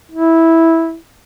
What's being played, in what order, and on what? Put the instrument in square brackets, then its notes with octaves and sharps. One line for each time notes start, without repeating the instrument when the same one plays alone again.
[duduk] E4